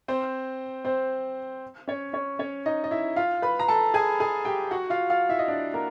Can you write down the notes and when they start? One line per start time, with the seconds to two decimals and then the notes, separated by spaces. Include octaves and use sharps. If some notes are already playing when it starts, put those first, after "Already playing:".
0.08 C4 C5
0.85 C4 C5
1.88 C#4 C#5
2.13 C#4 C#5
2.39 C#4 C#5
2.66 D#4 D#5
2.84 D#5
2.91 E4 E5
3.16 F4 F5
3.42 B4 B5
3.59 A#5
3.68 A4 A5
3.94 G#4 G#5
4.20 G#4 G#5
4.45 G4 G5
4.71 F#4 F#5
4.90 F4 F5
5.10 F4 F5
5.29 E4 E5
5.39 D#5
5.48 D4 D5
5.74 A#3 A#4